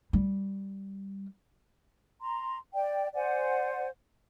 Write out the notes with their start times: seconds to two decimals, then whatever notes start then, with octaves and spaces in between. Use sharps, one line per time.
0.13 G3
2.21 A#5 C6
2.74 D5 G5
3.15 C5 D5 F#5 G#5